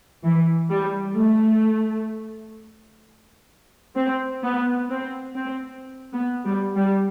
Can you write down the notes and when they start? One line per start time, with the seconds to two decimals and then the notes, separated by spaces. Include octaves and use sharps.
0.24 E3
0.70 G3
1.16 A3
3.95 C4
4.43 B3
4.90 C4
5.35 C4
6.13 B3
6.45 G3
6.76 G3